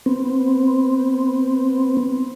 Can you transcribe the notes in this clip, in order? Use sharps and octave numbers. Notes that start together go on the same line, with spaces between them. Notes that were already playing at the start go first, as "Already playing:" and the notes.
B3 C4